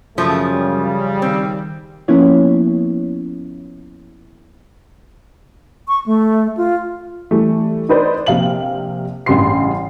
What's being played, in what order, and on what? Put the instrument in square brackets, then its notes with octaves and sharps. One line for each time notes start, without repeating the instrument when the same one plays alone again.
[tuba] F#2 [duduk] C#3 [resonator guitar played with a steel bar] F3 [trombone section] A3
[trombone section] G3
[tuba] D#3 [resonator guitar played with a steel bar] C4
[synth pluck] F3 A#3 B3 C#4 E4 C#5
[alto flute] C#6
A3
F4
[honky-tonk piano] E3 G3 A3
D4 D#4 B4 C5 D5
A#1 C3 F5 G5 F#7
A1 G2 C#3 G4 C6 C7